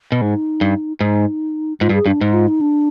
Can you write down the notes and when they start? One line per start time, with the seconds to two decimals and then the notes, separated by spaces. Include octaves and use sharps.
0.12 B2
0.21 G#2 D#4
0.61 G2
1.01 G#2 D#4
1.80 G#2 F4
1.89 G2
1.94 G#4
2.06 G2 D4
2.21 G#2 D#4
2.34 F4
2.48 D#4
2.61 D4